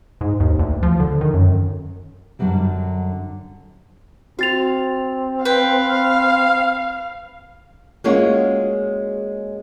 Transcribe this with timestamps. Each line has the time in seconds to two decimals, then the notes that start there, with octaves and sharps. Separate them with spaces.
0.21 G#2
0.40 D#2
0.59 D2
0.83 F3
1.00 D3
1.21 D#3
1.34 F#2
2.39 F#2 D3 E3 F#3 G3
4.39 C4 F#4 F5 A6 F7
5.45 B4 F5 G5
8.04 G#3 A#3 C#4 F4 F#4 G#4